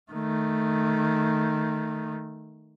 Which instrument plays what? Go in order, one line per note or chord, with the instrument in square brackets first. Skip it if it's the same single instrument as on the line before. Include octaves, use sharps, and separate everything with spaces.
[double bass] D#3 A3